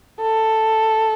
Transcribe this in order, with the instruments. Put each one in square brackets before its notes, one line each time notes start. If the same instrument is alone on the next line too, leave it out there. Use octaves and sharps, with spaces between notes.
[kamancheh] A4